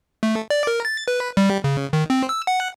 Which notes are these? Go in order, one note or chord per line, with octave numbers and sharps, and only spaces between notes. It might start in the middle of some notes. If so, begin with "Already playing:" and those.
A3
D5
A#4
A6
B4
G3
C#3
D#3
C4
E6
F#5